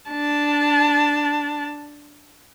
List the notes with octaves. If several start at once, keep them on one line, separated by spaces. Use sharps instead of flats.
D4 A5